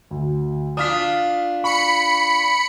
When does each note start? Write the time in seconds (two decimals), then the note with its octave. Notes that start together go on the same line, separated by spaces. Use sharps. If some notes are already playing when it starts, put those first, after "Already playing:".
0.11 D2
0.77 D4 F4 D#6 F6 B6
1.64 B5 C#6 C#7